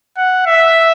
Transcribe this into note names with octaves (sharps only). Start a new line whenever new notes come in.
F#5
E5